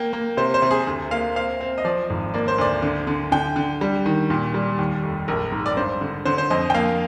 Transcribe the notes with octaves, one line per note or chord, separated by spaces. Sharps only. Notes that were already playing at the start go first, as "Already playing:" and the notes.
Already playing: A#3 G5
A#3
C3 C5
C5
C3
G#4
D2
A#3 F5
C4 F5
C4
D#5
F3 D5
G#1
A#3 D5
C5
D2 D5
D3
D3
D3 G5
D3
G3
D#3
A#2
G3
D#2
F1
A#1 A#4
G#2
D5
G2 C5
D3
D3 C5
C5
F2 D#5
G5
A#3 F5